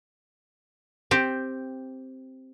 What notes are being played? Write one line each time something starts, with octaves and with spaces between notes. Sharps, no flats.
C4 G4